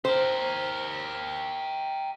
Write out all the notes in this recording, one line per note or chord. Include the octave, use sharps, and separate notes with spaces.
G4 A#4 C5